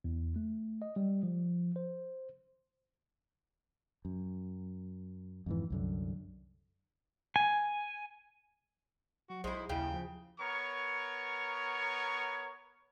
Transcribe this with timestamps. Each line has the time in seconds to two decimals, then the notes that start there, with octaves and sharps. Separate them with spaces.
0.04 E2
0.36 A3
0.82 D#5
0.96 G3
1.23 F3
1.76 C5
4.05 F#2
5.46 F2 G#2 E3
5.70 C2 F#2 D3
7.36 G#5
9.30 F#3 F#4
9.44 B1 G#3 E4 C5
9.69 D#2 C#3 E4 F5 G5
9.93 F3
10.40 B3 A#4 C#5 C#6